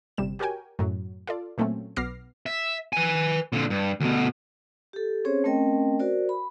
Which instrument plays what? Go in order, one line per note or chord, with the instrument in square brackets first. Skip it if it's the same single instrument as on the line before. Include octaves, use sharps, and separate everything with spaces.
[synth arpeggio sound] G1 C3 G3 E7
F#4 G4 A#4 C#5 G5 G#5
F#2 A2 F#3
F4 A4 D5
A#2 F#3 A3 A#3 C4 C#4
B1 B3 D6 F6 A#6 C7
[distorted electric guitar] E5
B4 G#5
A#2 D3
G2
D2 B2
[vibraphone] G4 A4
C4 C#4 G#4 C5 C#5
A3 C4 C#4 A#4 D#5 G5
F#4 A#4 C5 D5
B5